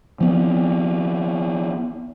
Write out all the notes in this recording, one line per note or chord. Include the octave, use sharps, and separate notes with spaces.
F3 B3 C4